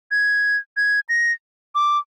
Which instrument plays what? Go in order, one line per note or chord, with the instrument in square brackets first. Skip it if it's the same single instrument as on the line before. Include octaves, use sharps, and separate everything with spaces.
[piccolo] G#6
G#6
A#6
D6